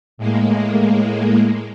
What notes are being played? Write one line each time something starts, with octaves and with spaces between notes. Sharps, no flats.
A2 G#3 A#3